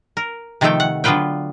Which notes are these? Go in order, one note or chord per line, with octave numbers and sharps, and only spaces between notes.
A#4
C3 D#3 F3 A3 A4 G5
F#5
D3 F#3 B3 F4 B4 G5